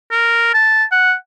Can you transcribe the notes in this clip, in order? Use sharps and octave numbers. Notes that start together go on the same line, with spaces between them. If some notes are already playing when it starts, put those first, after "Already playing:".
A#4
A5
F#5